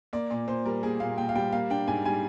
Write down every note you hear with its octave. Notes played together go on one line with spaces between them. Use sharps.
A#3 D5
A#2 D5
A#2 C5
G3 A#4
A#3 G#4
A#2 F5
A#2 G5
F5
G3 G5
A#3 F5
D4 G5
G#2 G#5
G3 G#5